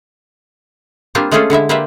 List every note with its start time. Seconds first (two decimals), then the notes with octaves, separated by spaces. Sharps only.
1.15 G3 A#3 C4 D4 F4 G4
1.31 G#3 A3 C#4 F4 G#4 A4
1.50 D3 G#3 E4 E5
1.69 A#3 G4 B4 C5 D5 E5